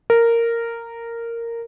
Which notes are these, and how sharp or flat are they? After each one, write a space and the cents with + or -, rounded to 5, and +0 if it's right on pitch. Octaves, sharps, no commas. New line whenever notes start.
A#4 -10